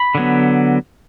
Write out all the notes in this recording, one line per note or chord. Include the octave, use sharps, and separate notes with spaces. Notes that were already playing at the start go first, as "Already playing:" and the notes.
Already playing: B5
D3 F#3 B3